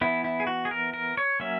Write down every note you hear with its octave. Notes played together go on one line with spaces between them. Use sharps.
E3 B3 E4
E4
G#4
F#4
G#4
A#4
A#4
C#5
F#3 A#3 C#4 E5